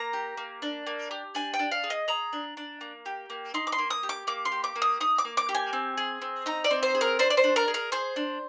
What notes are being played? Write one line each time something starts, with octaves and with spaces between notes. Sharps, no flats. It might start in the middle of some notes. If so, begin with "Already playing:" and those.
Already playing: A#3 A#5
G4
A#3
D4
A#3
G4
D4 G#5
G5
D4
F5
G#4
D#5
G#4 A#5
D4
D4
A#3
G4
A#3
D#4 C6
D6
C6
A#3
D#6
G4
D6
A#3 D6
C6
G4
D6
A#3
D#6
D#4 D#6
D6
A#3
D6
G4
G#5
C4
G#4
C4
D#4 A#5
D5
C4
C5
G#4
A#4
D4 C5
D5
C5
D4
A#4
G#4
A#4
G#4 C5
D4